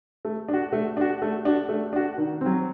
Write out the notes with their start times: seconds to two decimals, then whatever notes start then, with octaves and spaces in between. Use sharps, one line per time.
0.25 A3
0.48 D4 F#4
0.73 A3
0.97 D4 F#4
1.22 A3
1.45 D4 F#4
1.69 A3
1.93 D4 F#4
2.18 D#3
2.41 F#3 C4